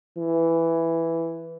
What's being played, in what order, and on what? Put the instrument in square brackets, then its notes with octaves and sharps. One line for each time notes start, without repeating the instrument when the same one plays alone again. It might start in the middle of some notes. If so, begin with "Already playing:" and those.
[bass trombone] E3